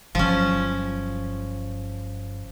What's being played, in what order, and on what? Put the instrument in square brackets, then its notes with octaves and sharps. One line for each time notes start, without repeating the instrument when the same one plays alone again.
[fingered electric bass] G1 F#3 [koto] F3 C#4